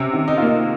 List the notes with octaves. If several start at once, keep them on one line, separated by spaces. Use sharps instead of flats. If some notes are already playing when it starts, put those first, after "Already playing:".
Already playing: C3 C#4
D#3
D#4
A#3 F4
D#4